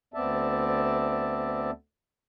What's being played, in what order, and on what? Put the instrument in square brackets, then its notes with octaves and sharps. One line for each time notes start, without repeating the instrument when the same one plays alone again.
[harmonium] D2 B3 C4 D5 E5 A5